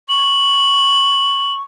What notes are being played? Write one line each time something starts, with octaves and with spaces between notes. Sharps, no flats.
C#6 F#7